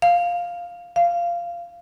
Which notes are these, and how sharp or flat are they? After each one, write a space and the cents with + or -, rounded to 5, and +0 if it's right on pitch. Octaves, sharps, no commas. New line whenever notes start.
F5 +5
F5 -15